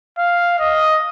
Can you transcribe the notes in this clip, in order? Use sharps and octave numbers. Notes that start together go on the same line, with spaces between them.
F5
D#5